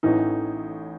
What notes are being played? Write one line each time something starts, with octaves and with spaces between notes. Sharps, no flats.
A1 A2 E3 D#4